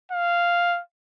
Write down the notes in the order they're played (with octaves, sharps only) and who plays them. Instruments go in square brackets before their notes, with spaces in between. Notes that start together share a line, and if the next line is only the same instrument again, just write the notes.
[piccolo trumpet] F5